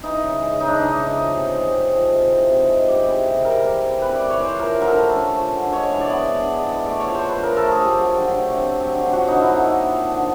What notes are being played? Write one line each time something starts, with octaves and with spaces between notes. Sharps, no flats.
E3 D#4
C#3
G#3
C#3 D#4
D4
E3 D#4
C#3
F3
C3
G#3
C4
F3
C3
E3
C3
G#3
C4 G4
E3
C3
G3 A#4
E3
C4
E3 B4
G3 D5
C#5
E3 C5
F3 A#4
D3 A#4
A4
A3
C#4
F3
D3
G#3 C#5
E3
D5
B3
D4
G#3
E3
A3 D5
C#5
F3
C5
D4 B4
F3 A#4
A4
A3
G#4
F3
G4
F#3
D3
A3
C4
F#3
D3
F3 F#4
D3 D#4
E4
A#3 D#4
D4
F3
D3